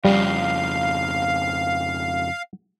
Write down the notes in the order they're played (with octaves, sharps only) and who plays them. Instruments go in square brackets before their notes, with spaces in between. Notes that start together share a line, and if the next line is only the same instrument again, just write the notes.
[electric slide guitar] F2 C#3 [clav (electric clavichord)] G3 [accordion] F5